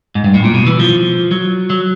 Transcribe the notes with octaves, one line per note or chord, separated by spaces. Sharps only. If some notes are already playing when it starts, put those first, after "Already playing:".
G#2
G2
A2
A#2
B2
E3
F3
F#3
F#3